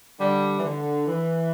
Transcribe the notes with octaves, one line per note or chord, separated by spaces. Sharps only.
D3 G3
E3
D3
E3